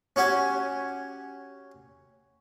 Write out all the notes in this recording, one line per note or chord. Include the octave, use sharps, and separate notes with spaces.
C#4 F#4 G4 G#5